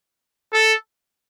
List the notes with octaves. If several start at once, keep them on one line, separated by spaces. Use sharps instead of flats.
A4